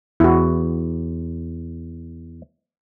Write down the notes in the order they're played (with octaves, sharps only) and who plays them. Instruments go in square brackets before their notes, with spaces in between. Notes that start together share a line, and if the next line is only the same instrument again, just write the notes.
[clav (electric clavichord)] E2 [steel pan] E4 F#4